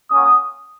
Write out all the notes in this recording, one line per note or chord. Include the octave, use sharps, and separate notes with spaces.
A#3 C#4 F#4 D#6